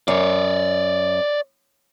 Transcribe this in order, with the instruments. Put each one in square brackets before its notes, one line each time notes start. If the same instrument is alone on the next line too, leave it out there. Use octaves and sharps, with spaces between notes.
[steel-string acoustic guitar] F#2 [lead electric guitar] C#5 D5